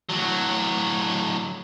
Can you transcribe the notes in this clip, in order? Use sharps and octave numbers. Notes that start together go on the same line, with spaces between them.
A2 F#3